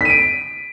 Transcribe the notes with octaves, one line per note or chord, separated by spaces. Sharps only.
B6 D7 D#7